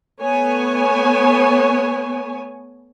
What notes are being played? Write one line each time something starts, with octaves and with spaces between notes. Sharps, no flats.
A3 B3 C#5 G#5